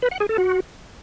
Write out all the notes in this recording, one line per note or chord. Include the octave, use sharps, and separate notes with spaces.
B4
F#5
G#4
A4
F#4